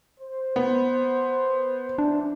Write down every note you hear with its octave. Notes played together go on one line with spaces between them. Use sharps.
C5
B3
E3 D4